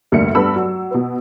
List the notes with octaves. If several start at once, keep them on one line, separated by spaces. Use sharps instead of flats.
F1 D2 G2 A#3 E5 C#7
G2 B3 A4 B5 E6
F#3
B2 B4